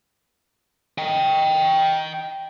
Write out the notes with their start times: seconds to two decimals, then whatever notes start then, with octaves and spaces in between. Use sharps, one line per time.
0.98 D#5 G5